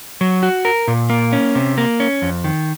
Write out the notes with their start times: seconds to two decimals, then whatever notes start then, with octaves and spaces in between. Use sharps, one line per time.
0.21 F#3
0.43 F#4
0.65 A#4
0.88 A#2
1.10 A#3
1.32 C#4
1.55 C3
1.78 A#3
2.00 C#4
2.22 F2
2.44 D#3